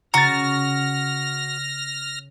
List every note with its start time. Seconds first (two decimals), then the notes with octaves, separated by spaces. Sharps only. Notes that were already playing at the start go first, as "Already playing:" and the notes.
0.14 C#3 F#4 A#5 F6 A6 A#6